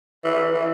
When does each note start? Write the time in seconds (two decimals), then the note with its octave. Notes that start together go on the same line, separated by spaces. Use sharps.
0.24 E3
0.54 E3